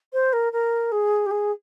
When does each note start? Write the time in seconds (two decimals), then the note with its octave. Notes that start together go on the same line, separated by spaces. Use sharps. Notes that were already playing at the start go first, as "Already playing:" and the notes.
0.13 C5
0.33 A#4
0.53 A#4
0.92 G#4
1.26 G4
1.31 G#4